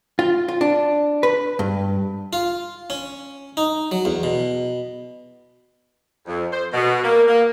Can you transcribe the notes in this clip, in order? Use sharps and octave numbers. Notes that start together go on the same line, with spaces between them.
F4
F4
D4
B4
G2
F4
C#4
D#4
F#3
E2
B2
F2
C5
B2
A#3
A#3